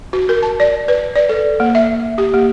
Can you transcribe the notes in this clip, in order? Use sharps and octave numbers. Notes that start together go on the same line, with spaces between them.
F#4
A#4
A5
D5
B4
D5
A4
A#3
E5
G4
A#3